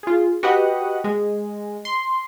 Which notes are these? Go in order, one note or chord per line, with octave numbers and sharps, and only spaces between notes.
F4 G#4
F#4 G4 B4 D#5 F#5
G#3
C6